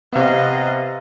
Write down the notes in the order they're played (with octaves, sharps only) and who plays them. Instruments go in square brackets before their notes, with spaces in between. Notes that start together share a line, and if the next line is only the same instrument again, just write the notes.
[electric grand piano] C3 B3 [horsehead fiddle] D#5 F5